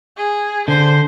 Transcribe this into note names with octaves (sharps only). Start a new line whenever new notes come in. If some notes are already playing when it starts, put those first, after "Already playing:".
G#4
D3 C5